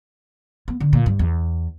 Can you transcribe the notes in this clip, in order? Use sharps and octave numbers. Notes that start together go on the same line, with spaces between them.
B3
D3
A#2
G2
E2